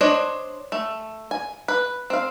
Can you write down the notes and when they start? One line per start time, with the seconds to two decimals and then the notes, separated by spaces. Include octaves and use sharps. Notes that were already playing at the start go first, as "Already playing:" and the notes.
0.01 D4 C5 C#5 D#5
0.72 A3
1.31 G#5
1.68 B4
2.10 C4 F5